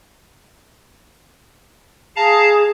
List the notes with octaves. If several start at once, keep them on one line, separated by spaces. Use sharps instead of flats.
G#4 F5 A5 A#5